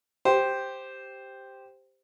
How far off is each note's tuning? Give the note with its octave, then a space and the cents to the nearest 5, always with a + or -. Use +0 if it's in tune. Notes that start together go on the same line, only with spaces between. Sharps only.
G4 +0 C5 +0